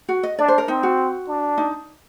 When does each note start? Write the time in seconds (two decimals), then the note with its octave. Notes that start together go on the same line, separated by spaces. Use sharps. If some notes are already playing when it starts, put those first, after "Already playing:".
0.08 F#4
0.23 D#5
0.39 D4 D5
0.48 C5
0.58 A#4
0.68 C4 D#4
0.83 F#4
1.28 D4
1.58 D#4